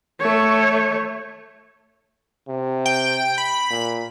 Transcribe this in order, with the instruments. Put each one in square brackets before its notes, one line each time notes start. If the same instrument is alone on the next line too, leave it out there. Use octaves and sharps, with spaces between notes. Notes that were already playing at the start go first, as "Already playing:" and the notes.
[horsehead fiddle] A3 C#5
[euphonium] C3
[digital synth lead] G5
B5
[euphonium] A#2